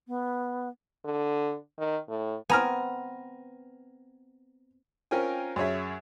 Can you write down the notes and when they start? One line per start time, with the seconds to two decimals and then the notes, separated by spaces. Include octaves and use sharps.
0.08 B3
1.05 D3
1.78 D#3
2.09 A2
2.49 B3 C4 G#5 A#5 F6
5.11 C4 C#4 F4 A#4 G5 G#5
5.56 F#2 G#4 C#5 E5